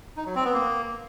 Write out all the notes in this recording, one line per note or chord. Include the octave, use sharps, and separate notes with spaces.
D#4
F#3
C4
B3
A#3